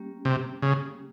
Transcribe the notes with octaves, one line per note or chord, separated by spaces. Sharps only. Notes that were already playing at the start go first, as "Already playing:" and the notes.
Already playing: G3 A#3 C#4 G4
C3
C#3